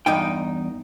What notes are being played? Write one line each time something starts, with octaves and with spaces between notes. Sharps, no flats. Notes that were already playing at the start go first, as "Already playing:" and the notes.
E2 G2 D#4 G5